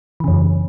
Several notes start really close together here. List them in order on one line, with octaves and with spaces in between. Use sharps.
E3 C#3 F#2